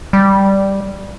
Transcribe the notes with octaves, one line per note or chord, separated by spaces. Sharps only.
G3